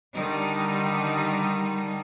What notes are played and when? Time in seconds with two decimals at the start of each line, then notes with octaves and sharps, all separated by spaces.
0.14 D3 D#3 G3 D#4